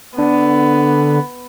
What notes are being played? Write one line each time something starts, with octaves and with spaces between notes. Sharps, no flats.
D3 B3